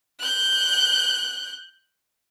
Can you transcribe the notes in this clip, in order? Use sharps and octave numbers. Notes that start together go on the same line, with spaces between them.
F#6 G6